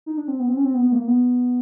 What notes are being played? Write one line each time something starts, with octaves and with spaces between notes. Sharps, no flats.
D#4
D4
C4
B3
C4
C#4
C4
B3
B3
A3
A#3
B3